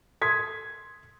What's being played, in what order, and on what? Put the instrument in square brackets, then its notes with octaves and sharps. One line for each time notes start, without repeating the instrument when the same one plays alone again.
[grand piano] C6 D#6 G#6 B6